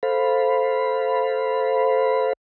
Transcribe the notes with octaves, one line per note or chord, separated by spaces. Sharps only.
A4 C5 F5 B5